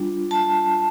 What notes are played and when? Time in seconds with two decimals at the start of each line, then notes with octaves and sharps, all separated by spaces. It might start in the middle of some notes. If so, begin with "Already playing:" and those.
Already playing: G3 D4 F4
0.31 A5